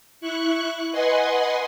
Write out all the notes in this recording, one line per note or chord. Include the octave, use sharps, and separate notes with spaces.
E4 C#6 F#6
B4 D#5 F#5 G#5 C6